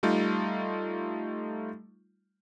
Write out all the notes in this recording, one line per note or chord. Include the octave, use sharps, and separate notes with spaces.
G3 A3 D#4 F4